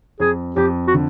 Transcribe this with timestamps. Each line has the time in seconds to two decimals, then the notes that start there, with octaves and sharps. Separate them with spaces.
0.20 F2 G#4
0.56 F2 G4
0.87 F#4
0.94 D3